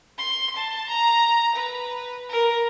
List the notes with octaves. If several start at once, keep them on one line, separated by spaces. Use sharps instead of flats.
C6
A5
A#5
B4
A#4